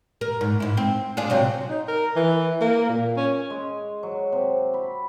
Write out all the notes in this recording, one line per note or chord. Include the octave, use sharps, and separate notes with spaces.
A#4
G#2
G#2 E4
C4
D4 F4 G#4
C3 F#3 C4
D#4
A#4
E3
A#3
A#2
C#4
G#3
F#3
C3
B5